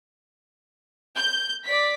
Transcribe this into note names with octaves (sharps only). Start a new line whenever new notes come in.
G6
D5 B6